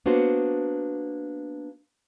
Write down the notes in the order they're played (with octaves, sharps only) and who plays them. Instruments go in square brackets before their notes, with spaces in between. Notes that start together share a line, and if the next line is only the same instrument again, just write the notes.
[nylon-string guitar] A#3 B3 D4 F#4 C5